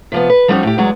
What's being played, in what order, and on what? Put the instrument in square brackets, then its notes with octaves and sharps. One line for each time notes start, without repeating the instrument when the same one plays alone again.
[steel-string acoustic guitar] C3 F3 B3
B4
F3 G3 B3 C#4 D#4 F#4
A2 G4
E2 F#3 G#3 F#4 D5